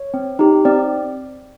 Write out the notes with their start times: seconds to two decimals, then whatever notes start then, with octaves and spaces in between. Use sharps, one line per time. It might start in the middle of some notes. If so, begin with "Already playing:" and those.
Already playing: C#5
0.14 C4
0.39 D#4 G4
0.65 C4 D5